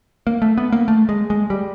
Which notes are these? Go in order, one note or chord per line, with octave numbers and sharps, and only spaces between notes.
A#3
A3
B3
A#3
A3
G#3
G#3
G3